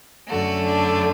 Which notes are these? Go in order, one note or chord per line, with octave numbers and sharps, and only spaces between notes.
F#2 D3 A3 F#4
D4